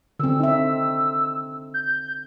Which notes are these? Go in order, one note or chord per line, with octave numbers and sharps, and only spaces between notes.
D3 C4 E6
D#4 E5
G6